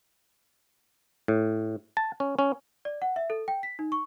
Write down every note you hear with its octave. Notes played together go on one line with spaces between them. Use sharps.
A2
A5
C#4
C#4
D5
F#5
E5
A4
G5
B6
D#4
C#6